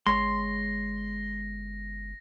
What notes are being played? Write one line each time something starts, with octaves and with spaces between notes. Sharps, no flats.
G1 G#3 C#5 C6 A#6